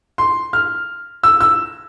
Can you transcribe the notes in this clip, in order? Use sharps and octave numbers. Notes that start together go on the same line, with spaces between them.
C6
F6
E6
E6